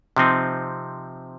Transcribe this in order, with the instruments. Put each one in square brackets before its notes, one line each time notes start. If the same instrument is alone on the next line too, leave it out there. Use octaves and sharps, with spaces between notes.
[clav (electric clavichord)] C3 F3 C4 D#4